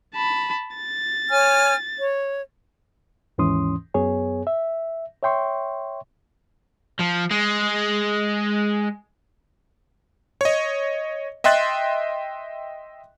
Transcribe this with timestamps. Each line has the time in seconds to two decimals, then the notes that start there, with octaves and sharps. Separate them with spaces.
0.14 A5 B5
0.77 A6
1.30 C#5 G#5 F6
1.99 C#5
3.38 D#2 G#2 E3 C#4 C6 D#6
3.94 F#2 B3 G#4 C#5 G#5
4.47 E5
5.23 C#5 E5 G5 C6 C#6
6.99 F3
7.31 G#3
10.41 C#5 D#5
11.44 D#5 E5 G5 C6 F#6 A6